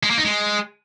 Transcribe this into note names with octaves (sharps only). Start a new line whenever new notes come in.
G#3
A#3
D#4
G#3